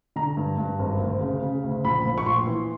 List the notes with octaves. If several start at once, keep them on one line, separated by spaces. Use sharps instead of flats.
D3 A#5
G2
G2
G#1
D2
C#3
C#3
D2
A#1 B5
A#1
C#6
A#1 C6
E3